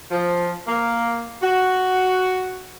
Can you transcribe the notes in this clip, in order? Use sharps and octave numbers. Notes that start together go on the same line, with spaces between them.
F3
A#3
F#4